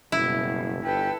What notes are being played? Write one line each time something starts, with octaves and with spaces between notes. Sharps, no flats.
F#1 B2 G3 E4
G1 A4 B4 G5